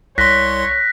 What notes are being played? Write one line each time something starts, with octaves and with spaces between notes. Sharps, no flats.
C2 C#5 C6 F#6 A#6 B6